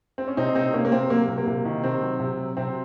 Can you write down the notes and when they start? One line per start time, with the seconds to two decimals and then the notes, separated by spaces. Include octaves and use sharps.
0.18 C4
0.28 C#4
0.37 C3 C4 D#4
0.55 C3 C4 D#4
0.74 C3 A#3 C#4
0.85 A#3
0.92 C3 C4
1.10 F#3 A#3
1.28 C3
1.38 A#3
1.47 C3
1.65 D#3
1.84 C3 C4
2.02 F#3
2.20 C3
2.38 F#3
2.57 C3 C4